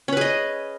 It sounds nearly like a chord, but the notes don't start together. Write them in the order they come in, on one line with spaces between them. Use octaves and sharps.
C#4 B4 G#4 D#5